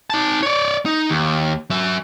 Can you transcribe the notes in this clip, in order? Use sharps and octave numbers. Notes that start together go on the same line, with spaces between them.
D#4 A5
C#5 D5
D#4
D#2
F#3 E5